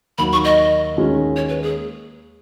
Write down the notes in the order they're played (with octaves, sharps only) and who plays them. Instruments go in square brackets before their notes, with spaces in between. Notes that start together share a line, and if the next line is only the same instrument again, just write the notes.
[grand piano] D#2 D#3 F#3 [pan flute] B5
[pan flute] C#6
D#5
[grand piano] D#2 D#3 G#3 C#4
[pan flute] C#5
B4
G#4